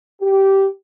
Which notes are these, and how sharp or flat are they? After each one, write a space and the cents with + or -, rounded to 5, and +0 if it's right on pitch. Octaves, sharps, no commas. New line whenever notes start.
G4 -10